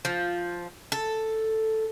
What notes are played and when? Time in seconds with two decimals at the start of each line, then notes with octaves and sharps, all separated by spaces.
0.05 F3
0.92 A4